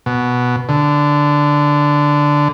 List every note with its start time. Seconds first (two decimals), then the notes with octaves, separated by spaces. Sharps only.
0.06 B2
0.69 D3